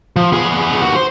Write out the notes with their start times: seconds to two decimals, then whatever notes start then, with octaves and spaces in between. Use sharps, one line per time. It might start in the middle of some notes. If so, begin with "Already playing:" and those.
0.16 F3
0.32 B3 G#4
0.82 D#2 F#4
0.96 C5